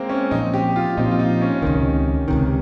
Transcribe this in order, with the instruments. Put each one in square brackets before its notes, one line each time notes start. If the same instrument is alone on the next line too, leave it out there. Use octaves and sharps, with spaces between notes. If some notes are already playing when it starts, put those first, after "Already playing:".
Already playing: [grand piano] G#3 A#3 C4
C#4
[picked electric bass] A#2 F3 C4 [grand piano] D#4
[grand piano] G4
F4
[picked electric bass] A#2 F3 C4 [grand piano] D#4
[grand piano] F4
D#4
C#4
[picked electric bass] C#2 C3 D#3
C#2 C3 D#3